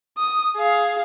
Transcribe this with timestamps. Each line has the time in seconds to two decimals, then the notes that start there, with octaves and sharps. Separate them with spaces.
0.17 D#6
0.57 G#4 F5